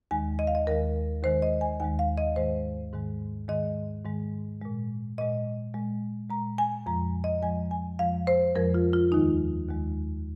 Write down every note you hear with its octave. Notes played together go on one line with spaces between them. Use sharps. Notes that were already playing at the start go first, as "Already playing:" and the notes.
D#2 D#3 G#3 G#5
D#5
F5
D#5
D#2 D#3 G#3 A#4
D#2 D#3 G#3 C5
D#5
G#5
D#2 D#3 G#3 G#5
F5
D#5
G#2 D#3 G#3 C5
G#2 D#3 G#3
G#2 D#3 G#3 D#5
G#2 D#3 G#3
A#2 G#3
A#2 G#3 D#5
A#2 G#3
A#2 G#3 A#5
G#5
F2 F3 G#3 A#5
D#5
F2 F3 G#3 G#5
G#5
F2 F3 G#3 F5
C5
F2 F3 G#3 A#4
F4
F4
D#2 D#3 G#3 D#4
D#2 D#3 G#3